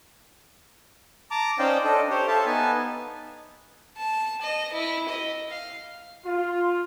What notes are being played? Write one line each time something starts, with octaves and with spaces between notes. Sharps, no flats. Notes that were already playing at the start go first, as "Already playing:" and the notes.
A5 A#5 D6
C#4 D#4 C5 D5 F5 G5
D4 A4 D#5
G4 C5 C#5
A4 E5 F5 A5
B3 D#4 G#5 A5
A5
D#5
E4
D#5
F5
F4